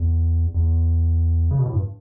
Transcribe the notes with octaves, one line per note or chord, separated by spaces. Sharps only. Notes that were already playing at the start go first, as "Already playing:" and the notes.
Already playing: E2
E2
C#3
B2
A2
G2